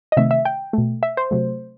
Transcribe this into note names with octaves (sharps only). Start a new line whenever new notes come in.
D#5
C3 D#3 A3 E5
E5
G5
B2 A3
E5
C5
C3 F#3 A3